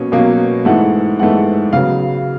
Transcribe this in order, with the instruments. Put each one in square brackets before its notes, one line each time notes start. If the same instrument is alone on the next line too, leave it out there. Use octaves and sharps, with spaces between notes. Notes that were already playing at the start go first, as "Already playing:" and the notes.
Already playing: [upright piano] B2 F#3 A#3 C#4
B2 F#3 A#3 C#4
G#2 E3 A3 F#5
G#2 E3 A3 F#5
C#3 F#3 B3 F5